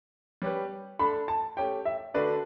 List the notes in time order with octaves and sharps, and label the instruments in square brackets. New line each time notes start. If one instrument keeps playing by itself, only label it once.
[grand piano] G3 C#4 G4 B4
[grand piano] A3 D4 A4 [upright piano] B5
[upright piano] A5
[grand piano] A3 C#4 G4 [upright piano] G5
[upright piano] E5
[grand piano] D3 A3 D4 F#4 B4 [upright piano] D5